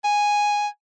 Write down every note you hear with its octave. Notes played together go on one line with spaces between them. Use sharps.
G#5